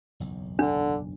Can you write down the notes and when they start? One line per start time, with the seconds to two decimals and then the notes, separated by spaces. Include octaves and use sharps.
0.20 F#1 B1 E2
0.59 D3 D4